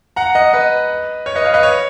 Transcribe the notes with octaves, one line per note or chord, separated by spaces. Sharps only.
F#5 A#5
D#5 F#5
B4 D#5
C#5
B4 D#5
C#5 F5
B4 D#5
C#5